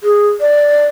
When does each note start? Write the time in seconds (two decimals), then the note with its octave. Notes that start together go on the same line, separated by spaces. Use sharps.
0.03 G#4
0.40 D5